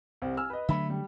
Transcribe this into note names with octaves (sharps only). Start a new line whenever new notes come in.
C2 C4
G#5 E6 F6
B4 D#5
D3 F#3 A3 E5 B5
G3